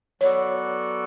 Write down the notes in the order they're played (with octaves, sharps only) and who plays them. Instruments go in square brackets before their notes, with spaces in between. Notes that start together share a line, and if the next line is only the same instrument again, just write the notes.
[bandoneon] F#3 B3 F#4 A4 D5 [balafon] C#5